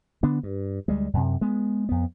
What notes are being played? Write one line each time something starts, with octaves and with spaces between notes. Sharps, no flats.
D3 B3 D4
G2
D2 G3 G#3
F#2 C3
G#3 B3
F2 B3